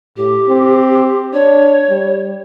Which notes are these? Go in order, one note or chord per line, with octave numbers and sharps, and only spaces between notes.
A2 G4
C4
D4 C#5
G3